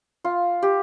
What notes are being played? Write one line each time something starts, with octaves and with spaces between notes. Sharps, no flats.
F4
G4